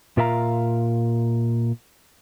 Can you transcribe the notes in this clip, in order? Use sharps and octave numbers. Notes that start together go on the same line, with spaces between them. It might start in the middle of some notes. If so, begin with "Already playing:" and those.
A#2 F4 A#4 E5 F5 A#5